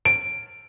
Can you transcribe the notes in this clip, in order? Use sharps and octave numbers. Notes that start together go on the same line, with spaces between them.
D7